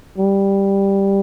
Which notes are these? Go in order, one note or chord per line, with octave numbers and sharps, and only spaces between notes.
G3